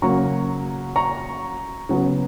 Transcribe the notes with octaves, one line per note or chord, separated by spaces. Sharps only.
C#3 F#3 A#3 A#5 C#6
A#5 C#6
C#3 F#3 B3